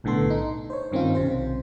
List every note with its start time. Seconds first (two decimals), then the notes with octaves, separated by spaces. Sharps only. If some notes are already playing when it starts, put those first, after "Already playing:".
0.04 B1 A2 D3 B3 A4 C6
0.30 D#4
0.70 C5 C#5
0.92 G2 D#3 C4 C#4 D#4 F4
1.15 B1 C3 C5